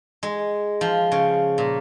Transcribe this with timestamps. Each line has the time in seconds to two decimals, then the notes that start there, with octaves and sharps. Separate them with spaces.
0.23 G#3
0.81 F3
1.12 C#3
1.58 A#2